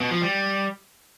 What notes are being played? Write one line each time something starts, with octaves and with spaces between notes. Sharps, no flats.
B2
F3
G3